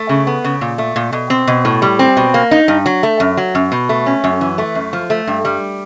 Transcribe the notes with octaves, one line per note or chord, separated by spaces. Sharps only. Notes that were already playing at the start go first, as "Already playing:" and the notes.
Already playing: A3
C#3
B3
C#3
A#2
A3
A#2
B2
C4
B2
A2
G3
C4
B2
A#3
D#4
G2
F#3
A3
F#2
F#3
F#2
B2
A3
C#4
F#2
E3
A3
F#2
F3
A3
G2
G3